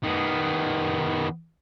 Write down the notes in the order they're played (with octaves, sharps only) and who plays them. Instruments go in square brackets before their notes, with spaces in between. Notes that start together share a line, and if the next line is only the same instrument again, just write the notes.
[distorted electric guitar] D#3 B3